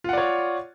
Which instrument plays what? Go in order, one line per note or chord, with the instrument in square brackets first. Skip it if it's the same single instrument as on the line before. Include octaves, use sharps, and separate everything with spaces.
[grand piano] F4
F#5
D5
C#5